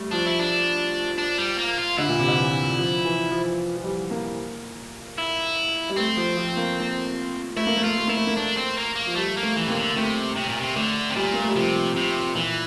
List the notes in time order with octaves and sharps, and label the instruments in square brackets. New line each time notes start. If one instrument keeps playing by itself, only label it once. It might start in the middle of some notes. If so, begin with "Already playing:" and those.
Already playing: [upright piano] G3 A3
[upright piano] F3 [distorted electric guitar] D4
[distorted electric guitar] E4
D4
D4
G3
A#3
F4
[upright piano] D3 [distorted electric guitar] E4
[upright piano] A#2
C3
D3
E3
F3
E3
F3
F3
G3
A#3
[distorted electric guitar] E4
[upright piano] G3
[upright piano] A3 [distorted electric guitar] C4
[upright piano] F3
F3
A#3
A#3
[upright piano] A3 [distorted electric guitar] E4
[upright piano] A#3
A3
[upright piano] A#3 [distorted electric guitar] F4
[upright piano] A3
[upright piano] A#3 [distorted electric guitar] E4
[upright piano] A3
A#3
[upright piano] A3 [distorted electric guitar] D4
[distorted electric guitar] C4
A#3
A#3
[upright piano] F3
[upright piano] G3 [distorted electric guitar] A3
[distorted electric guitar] A#3
[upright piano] A3
[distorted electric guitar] E3
[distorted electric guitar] C3 [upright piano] A#3
[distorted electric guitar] D3
[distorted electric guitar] C3 [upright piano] A3
[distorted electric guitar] C3
A#2
C3
[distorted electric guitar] D3 [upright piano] A3
[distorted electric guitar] C3
[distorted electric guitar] A#2 [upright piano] G3
[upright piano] A#3
A3
G3
[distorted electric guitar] C3 [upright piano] F3
[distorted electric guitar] C3
[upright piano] A#2 [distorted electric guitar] E3